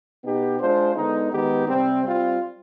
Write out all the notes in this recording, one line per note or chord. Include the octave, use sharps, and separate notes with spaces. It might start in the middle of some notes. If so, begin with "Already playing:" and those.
B2 B3 D#4 G4
G#3 D4 F4 C5
D3 G#3 B3 D#4
D#3 G#3 B3 D#4 G4
C3 G3 C4
G3 C4 F4